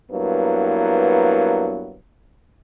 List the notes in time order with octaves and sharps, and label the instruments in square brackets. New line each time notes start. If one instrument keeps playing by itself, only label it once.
[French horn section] G2 F#3 A#3 B3 E4